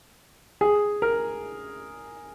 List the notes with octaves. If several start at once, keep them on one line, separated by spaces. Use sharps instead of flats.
G#4
A#4